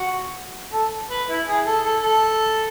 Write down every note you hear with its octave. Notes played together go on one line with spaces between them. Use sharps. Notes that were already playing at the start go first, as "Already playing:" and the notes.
Already playing: F#4
A4
B4
E4
G#4
A4
A4
A4